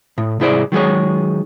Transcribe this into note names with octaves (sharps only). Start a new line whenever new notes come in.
A2
C2 G#2 E4 G#4 C5 D5
D#3 F#3 G#3 G#4 C#5